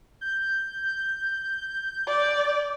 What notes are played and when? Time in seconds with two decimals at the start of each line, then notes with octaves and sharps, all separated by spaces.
0.21 G6
2.07 D5